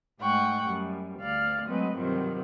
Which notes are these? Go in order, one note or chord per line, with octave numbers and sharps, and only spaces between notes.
G#2 G#3 A3 F#5 G5 C#6
F#2 G3
D2 D5 F5 F6
F#3 G#3 A3 C4 B4 D#5
G2 C3 D#3 F3 F#3 C4